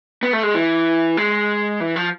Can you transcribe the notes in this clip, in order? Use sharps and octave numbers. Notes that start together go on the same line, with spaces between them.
B3
A3
G#3
E3
G#3
E3
F3